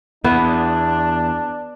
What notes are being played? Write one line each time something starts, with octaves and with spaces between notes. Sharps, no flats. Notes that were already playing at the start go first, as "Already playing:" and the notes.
E2 B3 D4